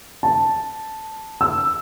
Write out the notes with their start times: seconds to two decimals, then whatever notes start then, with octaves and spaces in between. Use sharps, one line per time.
0.23 A5
1.41 E6